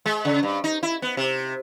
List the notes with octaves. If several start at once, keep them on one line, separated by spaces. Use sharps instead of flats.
G#3
C#3
G2
D#4
E4
B3
C3